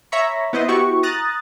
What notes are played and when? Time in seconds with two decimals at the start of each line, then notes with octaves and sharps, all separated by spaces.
0.12 C#5 E5 A#5 B5 C#6
0.53 B3 E4 C5 D#5
0.68 B3 E4 F#4 G4 C#6
1.03 A#5 D#6 F#6 A6